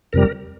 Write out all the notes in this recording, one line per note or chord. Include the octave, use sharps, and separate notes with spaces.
F2 C3 G3 A#4